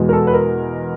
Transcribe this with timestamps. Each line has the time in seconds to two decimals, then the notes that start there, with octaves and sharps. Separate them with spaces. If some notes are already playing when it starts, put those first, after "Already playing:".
Already playing: E2 B2 G#3
0.09 A#4
0.13 A4
0.27 B4
0.33 A#4